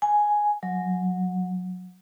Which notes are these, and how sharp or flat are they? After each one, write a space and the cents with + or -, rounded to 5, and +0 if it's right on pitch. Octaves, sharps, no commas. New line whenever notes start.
G#5 +5
F#3 -20